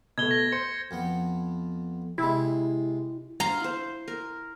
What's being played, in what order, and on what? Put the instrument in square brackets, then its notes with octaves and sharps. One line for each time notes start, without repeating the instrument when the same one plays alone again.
[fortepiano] B2 A3 [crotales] G#6 G7
[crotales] A#6
[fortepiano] C5 [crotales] C#7
[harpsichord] F2 B3
[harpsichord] C3 G#3 [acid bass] E4
[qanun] F5 C6 [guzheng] A#5
[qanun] E4 C5
A#4